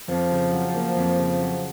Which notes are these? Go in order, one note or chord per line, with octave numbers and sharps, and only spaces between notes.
F2 F3
C#3
F#3
A#3
F2
C#3
F#3